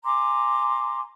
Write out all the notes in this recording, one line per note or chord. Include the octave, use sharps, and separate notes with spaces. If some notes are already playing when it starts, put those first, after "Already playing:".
G#5 A#5 C6 D6